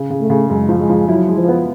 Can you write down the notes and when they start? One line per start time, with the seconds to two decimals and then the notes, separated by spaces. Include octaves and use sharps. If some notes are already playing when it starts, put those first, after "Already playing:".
Already playing: C#3
0.10 C#3
0.20 A3
0.30 C#3
0.49 F#2 G#3
0.69 F3
0.79 G#3
0.89 F3
1.08 F#3 E4
1.29 G#3
1.38 F3
1.48 B3